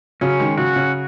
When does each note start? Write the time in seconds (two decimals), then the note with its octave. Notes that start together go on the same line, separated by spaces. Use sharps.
0.21 C#3 F#3 C#4
0.40 D#3 G#3
0.58 C#3 F#3 F#4
0.76 C#3 F#3